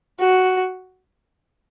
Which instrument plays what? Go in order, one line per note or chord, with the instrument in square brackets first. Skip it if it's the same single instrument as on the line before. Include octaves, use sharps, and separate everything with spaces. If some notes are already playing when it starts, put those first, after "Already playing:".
[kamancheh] F#4